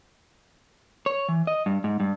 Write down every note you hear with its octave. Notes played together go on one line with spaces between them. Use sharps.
C#5
E3
D#5
G2
G#2
G2